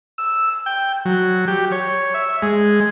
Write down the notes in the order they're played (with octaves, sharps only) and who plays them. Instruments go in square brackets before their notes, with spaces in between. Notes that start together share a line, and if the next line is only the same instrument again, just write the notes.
[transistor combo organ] E6
G5
F#3
G4
C#5
E5
G#3